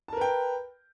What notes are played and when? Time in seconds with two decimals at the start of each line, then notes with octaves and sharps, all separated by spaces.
0.08 A5
0.13 A#4
0.17 B4
0.21 G5